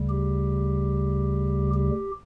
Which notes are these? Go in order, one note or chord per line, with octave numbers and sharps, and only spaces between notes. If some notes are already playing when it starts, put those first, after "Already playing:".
Already playing: D2 C#3 G3
G4
G4